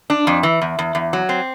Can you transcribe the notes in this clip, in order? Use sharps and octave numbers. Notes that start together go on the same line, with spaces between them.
D4
F2
E3
E2
E2
E2
F#3
C4